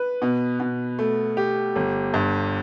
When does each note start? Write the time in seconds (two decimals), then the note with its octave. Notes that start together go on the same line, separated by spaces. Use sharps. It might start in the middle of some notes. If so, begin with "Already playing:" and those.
Already playing: B4
0.22 B2
0.60 B2
0.99 A3
1.37 G4
1.76 G1
2.14 G2